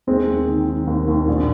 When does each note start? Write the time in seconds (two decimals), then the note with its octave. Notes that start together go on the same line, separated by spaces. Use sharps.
0.07 D#2 G#3 C4
0.28 D#2
0.48 D#3
0.67 D#3
0.87 D#2
1.08 D#2
1.28 A#1